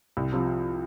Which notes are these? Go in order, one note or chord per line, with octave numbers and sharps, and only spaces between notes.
C2
C3 F3